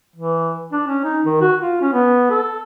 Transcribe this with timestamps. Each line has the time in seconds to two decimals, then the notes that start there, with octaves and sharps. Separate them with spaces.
0.16 E3
0.72 D4
0.88 C#4
1.04 D#4
1.26 D#3
1.41 F#4
1.61 F4
1.81 C#4
1.93 B3
2.30 A4